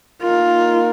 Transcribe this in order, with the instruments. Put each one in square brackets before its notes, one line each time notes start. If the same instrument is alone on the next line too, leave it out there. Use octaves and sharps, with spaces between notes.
[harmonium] A#3 D#4 A#4 [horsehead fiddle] F4